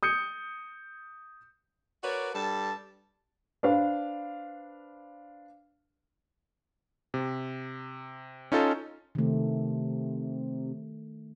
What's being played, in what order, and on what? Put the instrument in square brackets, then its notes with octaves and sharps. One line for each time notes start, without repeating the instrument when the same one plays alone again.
[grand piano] D#6 G6 C#7
[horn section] F#4 A#4 B4 C#5 D5
G2 G3 A4 A5
[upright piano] D4 B4 C5 F5
[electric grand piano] C3
C#4 D#4 F4 A4 F5 A5
[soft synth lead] C3 [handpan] D#3 A3